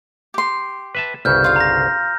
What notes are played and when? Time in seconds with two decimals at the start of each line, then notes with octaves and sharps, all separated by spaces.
0.34 G4 C6
0.95 B4 E5 A5
1.25 G1 C2 C#3 F6 G6
1.44 F4 F5
1.56 A#5 A#6